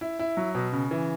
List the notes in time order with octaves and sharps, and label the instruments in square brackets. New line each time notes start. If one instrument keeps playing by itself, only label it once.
[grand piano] E4
E4
F#3
B2
C#3
E3